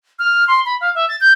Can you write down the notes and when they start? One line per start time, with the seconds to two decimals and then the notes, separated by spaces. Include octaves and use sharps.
0.19 F6
0.48 C6
0.65 B5
0.81 F5
0.95 E5
1.09 A6
1.21 G6